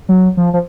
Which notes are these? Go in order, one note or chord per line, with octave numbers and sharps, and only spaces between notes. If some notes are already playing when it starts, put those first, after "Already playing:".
F#3
F3
F3